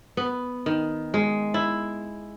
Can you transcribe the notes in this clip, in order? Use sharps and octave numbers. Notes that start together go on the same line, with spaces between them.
B3
D#3
G#3
E4